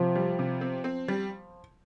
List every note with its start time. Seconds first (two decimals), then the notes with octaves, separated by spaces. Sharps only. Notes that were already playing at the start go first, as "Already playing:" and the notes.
Already playing: C3 F3
0.16 G3
0.39 C3
0.61 C4
0.84 C4
1.08 G3